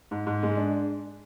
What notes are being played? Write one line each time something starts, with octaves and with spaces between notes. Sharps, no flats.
G#2
G#2
G#3
D4